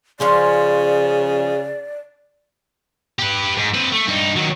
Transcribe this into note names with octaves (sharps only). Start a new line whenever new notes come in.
C#3 F3 C#4 C5 D5
G4 B4
G#2
C4 B4
A3
G2 D#4
D#3 F#3